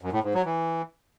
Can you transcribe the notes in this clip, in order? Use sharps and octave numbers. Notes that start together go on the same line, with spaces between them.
F#2
A2
G#2
F#3
E3